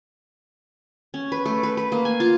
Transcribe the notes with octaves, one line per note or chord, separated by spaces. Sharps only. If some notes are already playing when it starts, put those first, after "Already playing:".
C#4
B4
A3
B4
B4
A#3
G#5
F4